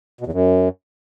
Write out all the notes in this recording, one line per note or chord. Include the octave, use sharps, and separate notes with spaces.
B2
E2
F#2